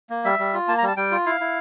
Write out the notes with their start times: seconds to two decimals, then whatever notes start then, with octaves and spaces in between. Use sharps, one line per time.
0.10 A#3
0.25 G3 E5
0.39 G3
0.54 F4
0.68 A#3 A5
0.78 A#5
0.82 G3
0.88 A5
0.97 G3 G5
1.11 F4
1.26 E4 F5
1.41 E4